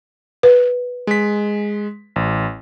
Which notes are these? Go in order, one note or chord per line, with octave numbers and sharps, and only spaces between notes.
B4
G#3 B6
A1